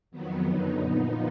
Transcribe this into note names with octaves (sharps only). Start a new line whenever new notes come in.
F2 D#3 F#3 B3
F#2 D3 F#3 B3 D#4
A#2 F3 B3 D#4